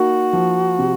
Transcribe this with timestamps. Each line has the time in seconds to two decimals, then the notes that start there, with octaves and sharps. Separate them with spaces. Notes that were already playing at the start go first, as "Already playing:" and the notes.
Already playing: A#3 D#4 F#4
0.33 F3
0.79 C3